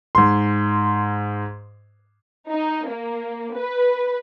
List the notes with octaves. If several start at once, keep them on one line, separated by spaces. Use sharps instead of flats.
G#2 C6
D#4
A#3
B4